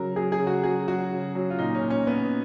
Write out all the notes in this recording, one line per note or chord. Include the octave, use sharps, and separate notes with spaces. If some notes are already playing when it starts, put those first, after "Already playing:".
Already playing: C#3 F#3 A#4
F#3 G#4
G#4
C#3
F#4
F#3 G#4
F#3 F#4
C#3
F#3
F4
A#2 D#4
C#4
A#2
C#4
A#2 B3